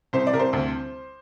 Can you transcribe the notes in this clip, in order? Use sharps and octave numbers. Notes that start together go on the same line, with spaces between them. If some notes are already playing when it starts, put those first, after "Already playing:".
C2 C5
D5
C2 A#4
C5
D2